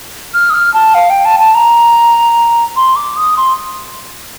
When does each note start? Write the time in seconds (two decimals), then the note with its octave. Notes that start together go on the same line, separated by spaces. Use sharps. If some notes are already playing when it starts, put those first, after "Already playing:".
0.34 F6
0.50 D#6
0.54 F6
0.74 A5
0.95 F5
1.10 G5
1.25 A5
1.40 A5
1.55 A#5
2.76 C6
2.96 D6
3.17 D#6
3.37 C6